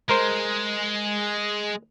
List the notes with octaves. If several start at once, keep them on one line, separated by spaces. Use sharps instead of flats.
G#3 A#4 C5